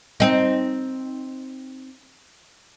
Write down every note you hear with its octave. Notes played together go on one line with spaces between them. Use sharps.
C4 D#4